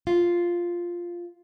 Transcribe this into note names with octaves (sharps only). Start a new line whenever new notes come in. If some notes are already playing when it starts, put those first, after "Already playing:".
F4